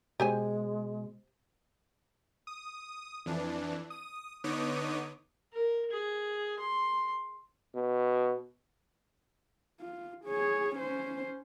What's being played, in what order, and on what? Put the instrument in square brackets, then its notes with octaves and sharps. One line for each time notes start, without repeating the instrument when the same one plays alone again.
[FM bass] B2 [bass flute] G#3 [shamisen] G4 C5 G#5
[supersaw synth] D#6
F2 E3 D4
D#6
D3 B3 D#4 C#5 D6 D#6
[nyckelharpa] A#4
G#4
C6
[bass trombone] B2
[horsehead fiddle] F4
G#4 C#5
C#4 C5